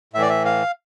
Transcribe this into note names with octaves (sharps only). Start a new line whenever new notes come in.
A2 E3 D5 E5
E5
F5